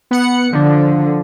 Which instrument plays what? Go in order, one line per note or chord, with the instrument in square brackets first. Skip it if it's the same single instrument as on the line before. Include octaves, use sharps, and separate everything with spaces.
[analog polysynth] B3 F#5 C#7
[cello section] D3 [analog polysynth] F3 D4